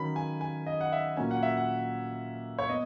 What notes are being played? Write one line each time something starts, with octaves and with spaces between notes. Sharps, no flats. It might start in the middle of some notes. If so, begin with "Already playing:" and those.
Already playing: D#3 F#3 C#4 B5
G#5
G#5
D#5
F#5
E5
A#2 F#3 A#3 C#4 G#5
F#5
E5
F#5
C#5
B3 D#5